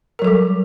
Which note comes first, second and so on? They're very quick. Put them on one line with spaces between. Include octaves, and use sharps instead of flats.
A#4 F#3 A4 G3